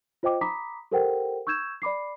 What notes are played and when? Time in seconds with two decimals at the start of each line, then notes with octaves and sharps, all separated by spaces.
0.23 F4 C5 D#5 G5 D6
0.41 A#5 B5 D6 D#6 B6
0.91 G4 A4 A#4 C5 F#5 G5
1.47 C#6 E6 G6 G#6 E7
1.82 D5 B5 D6 C7